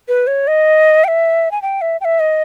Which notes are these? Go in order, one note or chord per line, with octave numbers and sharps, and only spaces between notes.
B4
C#5
D#5
G5
E5
G#5
G5
E5
G5
E5
D#5